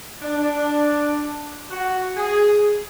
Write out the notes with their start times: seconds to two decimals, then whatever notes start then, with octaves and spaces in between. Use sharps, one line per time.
0.22 D4
1.70 F#4
2.16 G#4